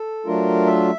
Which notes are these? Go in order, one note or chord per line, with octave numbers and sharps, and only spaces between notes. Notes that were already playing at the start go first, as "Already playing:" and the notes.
Already playing: A4
F#3 A3 D4 F4 A#4
E5